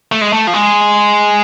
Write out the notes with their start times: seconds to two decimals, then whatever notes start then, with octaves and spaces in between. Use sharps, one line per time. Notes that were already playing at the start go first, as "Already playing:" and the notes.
0.12 A3
0.21 G#3
0.32 A3
0.47 F3
0.53 G#3